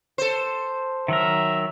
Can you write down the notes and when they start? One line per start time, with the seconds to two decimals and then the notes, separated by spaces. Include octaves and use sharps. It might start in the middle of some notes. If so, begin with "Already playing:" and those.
0.18 A4 C5
1.08 D#3 F#3 A#4 E5